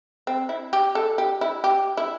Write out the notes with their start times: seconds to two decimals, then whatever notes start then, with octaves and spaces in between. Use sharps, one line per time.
0.27 C4
0.49 E4
0.73 G4
0.95 A4
1.18 G4
1.41 E4
1.64 G4
1.97 E4